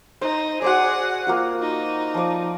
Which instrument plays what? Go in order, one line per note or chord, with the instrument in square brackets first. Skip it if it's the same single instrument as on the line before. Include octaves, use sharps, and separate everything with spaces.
[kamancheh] D#4 [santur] C5
[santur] F#4 C5 D5 [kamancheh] G#4 F#5
[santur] A#3 F4 F#4
[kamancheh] D#4
[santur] F3 D5